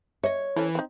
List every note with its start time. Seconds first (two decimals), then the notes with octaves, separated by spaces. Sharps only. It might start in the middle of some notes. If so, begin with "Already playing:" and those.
0.23 C#5 D#5 E5
0.56 E3 C#4 A4 C5
0.75 C4 D#4